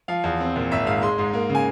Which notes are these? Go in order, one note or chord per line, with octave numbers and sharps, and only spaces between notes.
F3 F5
E2
C4
A#2
G#1 E5
G#2 F5
G#3 C6
G#2
A#3
C#3
G#5